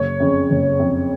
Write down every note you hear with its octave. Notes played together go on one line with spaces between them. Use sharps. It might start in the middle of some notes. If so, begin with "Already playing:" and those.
Already playing: F#1 C#5
F2 C#3
F#1
F2 C#3